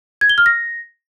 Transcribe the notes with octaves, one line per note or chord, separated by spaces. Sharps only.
G#6
G7
F6
A#6